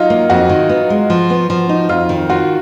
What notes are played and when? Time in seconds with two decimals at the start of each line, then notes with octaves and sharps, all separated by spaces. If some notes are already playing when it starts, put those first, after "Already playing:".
Already playing: F#3 D#4 F4
0.10 A#3
0.30 F2 F#4
0.49 D#3
0.69 B3
0.90 G#3
1.10 F3
1.30 B3
1.50 F3
1.69 D#4
1.89 F2 F4
2.09 D#3
2.30 F4 F#4